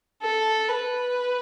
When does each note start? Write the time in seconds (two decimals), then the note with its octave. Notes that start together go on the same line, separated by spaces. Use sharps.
0.22 A4
0.68 B4